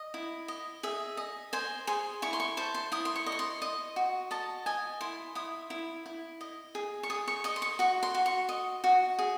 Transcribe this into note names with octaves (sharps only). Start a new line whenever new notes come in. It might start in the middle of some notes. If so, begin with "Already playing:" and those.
Already playing: D#5
E4
D#5
G#4 E5
D#5
C5 G#5
G#4 C6
E4 C#6
C6
C#6
C5 A5
C6
E4 D#6
C6
C#6
D#5
C#6
C6
D#5
F#4
D#5 A5
D#5 G#5
E4 C6
E4 D#6
E4
E4
D#5
G#4
C#6
G#4 D#6
C#6
D#5 C#6
C6
C#6
F#4 C#6
C6
F#4
C#6
D#5
F#4
G#4